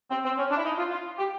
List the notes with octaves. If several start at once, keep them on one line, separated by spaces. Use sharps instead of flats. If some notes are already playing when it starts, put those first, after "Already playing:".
C4
C4
C#4
D4
E4
D#4
F4
F4
G4